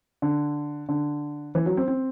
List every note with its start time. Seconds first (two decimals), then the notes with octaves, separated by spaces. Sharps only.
0.22 D3
0.89 D3
1.55 E3
1.66 F#3
1.77 C4
1.88 C4